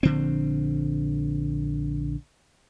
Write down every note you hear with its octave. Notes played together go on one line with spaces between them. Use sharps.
A#1 D3 C4